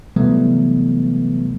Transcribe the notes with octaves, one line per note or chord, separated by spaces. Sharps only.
C3 E3 F#3 G3 A3 B3